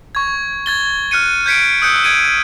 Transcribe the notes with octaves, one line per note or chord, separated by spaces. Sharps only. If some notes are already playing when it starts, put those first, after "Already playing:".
C#6 G#6
G#6 A6 G7
F6 F#6 C#7 D#7
G6 G#6 B6 C#7 D7
D#6 E6 F#6 G6 C#7
G#6 D7 D#7